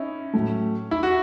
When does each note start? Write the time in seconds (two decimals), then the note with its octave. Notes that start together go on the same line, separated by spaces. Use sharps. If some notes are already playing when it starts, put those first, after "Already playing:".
Already playing: C#4 D#4 E4
0.34 A2 F#3 A3
0.91 E4
1.03 F#4